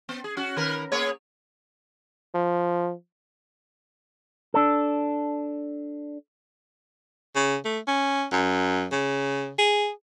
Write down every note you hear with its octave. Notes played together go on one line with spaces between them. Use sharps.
B3
G#4
C#4 F#4
D#3 A#4 B4
A#3 G#4 C#5
F3
D4 A4
C#3
A3
C#4
F#2
C#3
G#4